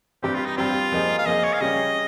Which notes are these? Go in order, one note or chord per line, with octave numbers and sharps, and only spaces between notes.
G2 G3 C4 G4
F4
D#4
G2 G3 C4 F4
F3 A#3 D#4 G#4
F5
F3 A#3 D#4 G#4 D#5
C#5
F5
C#3 G3 C#4 G4 D#5